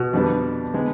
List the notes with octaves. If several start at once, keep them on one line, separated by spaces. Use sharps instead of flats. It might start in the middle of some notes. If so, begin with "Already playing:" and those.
Already playing: B2
F2 D3 G3 B3 D4
D3 G#3 B3